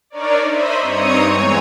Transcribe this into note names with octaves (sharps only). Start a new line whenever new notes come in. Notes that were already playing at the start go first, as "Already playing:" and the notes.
D4 D#4 A#4 C#5 D5
C5 D#5 E5 B5
G2 C4 D#4 C#5 D#6 C#7
E2 E3 G#3 C#5 A#5